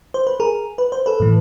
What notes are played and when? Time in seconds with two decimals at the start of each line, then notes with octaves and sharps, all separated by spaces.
0.14 C5
0.27 B4
0.40 G#4 A#4
0.78 B4
0.92 C5
1.06 A4 B4
1.20 A2 E3